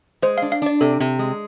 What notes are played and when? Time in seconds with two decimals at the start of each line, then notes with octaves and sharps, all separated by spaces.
0.22 G#3 C5
0.38 D4 F5
0.52 F5
0.62 D4 D5
0.81 C3 A4
1.00 C3
1.19 G#3